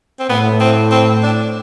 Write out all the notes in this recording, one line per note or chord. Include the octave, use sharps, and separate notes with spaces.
C4
A2 B3
C4
C4
D4